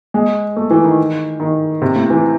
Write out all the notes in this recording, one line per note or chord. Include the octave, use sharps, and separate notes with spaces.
G#3
A3
E3
D#3
D#3
C3
A2
E3